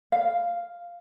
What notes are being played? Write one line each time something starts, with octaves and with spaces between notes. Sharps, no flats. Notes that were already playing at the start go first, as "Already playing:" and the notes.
F5